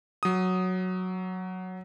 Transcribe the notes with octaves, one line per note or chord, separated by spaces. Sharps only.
F#3 D#6